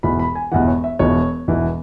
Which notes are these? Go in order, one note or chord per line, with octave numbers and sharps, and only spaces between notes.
E1 E2 E3 B5
B5
G#5
E1 E2 E3 F#5
C#5
E5
E1 E2 E3 C#5
E1 E2 E3